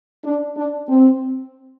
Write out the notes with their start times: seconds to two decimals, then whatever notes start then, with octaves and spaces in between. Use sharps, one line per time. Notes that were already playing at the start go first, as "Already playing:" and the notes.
0.24 D4
0.56 D4
0.88 C4